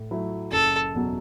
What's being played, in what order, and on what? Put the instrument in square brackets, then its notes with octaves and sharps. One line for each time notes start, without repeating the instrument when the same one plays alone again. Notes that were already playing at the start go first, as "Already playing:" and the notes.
Already playing: [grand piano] A2
F#3 A3 E4
[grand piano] F#1 [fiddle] A4
[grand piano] E2 B2 F#3